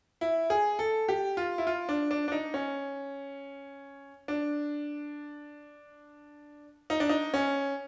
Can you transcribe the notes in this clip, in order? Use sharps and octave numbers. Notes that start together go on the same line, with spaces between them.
E4
G#4
A4
G4
F4
E4
F4
D4
D4
D4
D#4
C#4
D4
D#4
D4
D#4
C#4